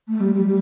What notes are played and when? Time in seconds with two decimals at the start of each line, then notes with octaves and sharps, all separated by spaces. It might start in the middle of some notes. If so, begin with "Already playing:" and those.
0.08 A3
0.20 G3
0.33 G3
0.45 G3